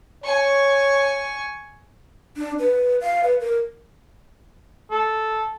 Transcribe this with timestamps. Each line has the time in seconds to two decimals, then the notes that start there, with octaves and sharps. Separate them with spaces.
0.24 C#5 G#5 C#6
2.37 D4
2.59 B4
3.01 F5
3.23 B4
3.40 A#4
4.91 A4